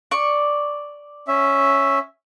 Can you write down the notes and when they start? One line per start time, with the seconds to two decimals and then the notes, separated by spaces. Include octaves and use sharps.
0.11 D5 C#6
1.28 C#4 E5